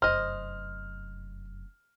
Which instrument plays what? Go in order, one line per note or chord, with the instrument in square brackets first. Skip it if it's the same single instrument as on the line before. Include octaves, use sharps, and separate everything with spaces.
[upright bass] F1 F#2 [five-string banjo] C5 D#5 [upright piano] F6